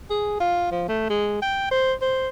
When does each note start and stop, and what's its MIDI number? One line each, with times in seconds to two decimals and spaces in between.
0.10 0.36 68
0.40 0.70 65
0.71 0.86 53
0.88 1.05 57
1.10 1.38 56
1.42 1.69 79
1.71 1.93 72
2.01 2.29 72